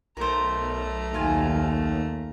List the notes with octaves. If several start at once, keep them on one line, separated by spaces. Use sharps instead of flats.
B1 A3 A#4 C5 A#5
D#2 F4 F5 G#5